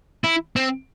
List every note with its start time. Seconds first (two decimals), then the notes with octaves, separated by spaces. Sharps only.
0.24 E4
0.56 C4